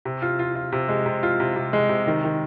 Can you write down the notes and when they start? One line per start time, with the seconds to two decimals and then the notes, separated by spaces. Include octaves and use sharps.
0.05 C3
0.22 F4
0.39 F4
0.55 F4
0.72 C3
0.89 G#3
1.06 C3
1.23 F4
1.40 C3
1.56 C3
1.73 G#3
1.89 C3
2.07 D#3
2.24 D#3